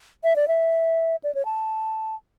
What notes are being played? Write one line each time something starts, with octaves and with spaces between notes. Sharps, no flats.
E5
D5
E5
D5
C#5
A5